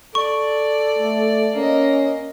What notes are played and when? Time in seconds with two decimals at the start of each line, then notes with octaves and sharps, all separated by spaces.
0.15 A4 D5 C#6
0.98 A3
1.55 A#3 C#4 D#5